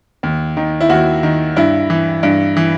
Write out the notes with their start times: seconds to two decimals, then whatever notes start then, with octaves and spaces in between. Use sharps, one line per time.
0.23 D#2
0.57 D#3
0.81 E4
0.89 D#2 F#4
1.23 D#3
1.56 G2 E4
1.90 E3
2.23 G2
2.57 E3